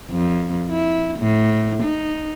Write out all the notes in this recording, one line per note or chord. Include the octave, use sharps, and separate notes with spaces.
F2
E4
A2
D#4